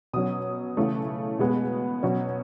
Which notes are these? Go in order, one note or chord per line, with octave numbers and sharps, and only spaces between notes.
B2 F#3 C#4 D#6
C#3 E3 A3 C#4
B2 G#3 B3
B2 F#3 C#4